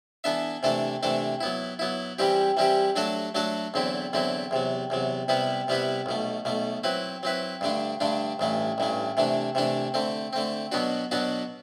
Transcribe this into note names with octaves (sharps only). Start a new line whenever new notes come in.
E3 B3 D4 A4 E5
C3 E3 A3 D4 A4
C3 E3 A3 D4 A4
F#3 B3 E4
F#3 B3 E4
E3 G3 C4 E4 G4
E3 G3 C4 E4 G4
F#3 A3 D4 F#4 A4
F#3 A3 D4 F#4 A4
E2 D3 F#3 C4 E4
E2 D3 F#3 C4 E4
E2 C3 F#3
E2 C3 F#3
C3 G3 B3 E4 B4
C3 G3 B3 E4 B4
B1 B2 A3
B1 B2 A3
F#3 C4 E4 B4
F#3 C4 E4 B4
G2 D3 A3 D4
G2 D3 A3 D4
A1 G2 E3 A3
A1 G2 E3 A3
C3 E3 A3 D4
C3 E3 A3 D4
D3 A3 C4
D3 A3 C4
B2 F#3 B3 D4 F#4
B2 F#3 B3 D4 F#4